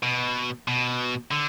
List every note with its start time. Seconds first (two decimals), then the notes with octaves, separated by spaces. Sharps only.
0.03 B2
0.68 B2
1.31 D3